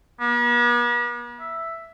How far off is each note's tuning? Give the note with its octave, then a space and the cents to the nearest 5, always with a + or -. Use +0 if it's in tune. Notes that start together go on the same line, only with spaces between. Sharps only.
B3 -45
E5 +5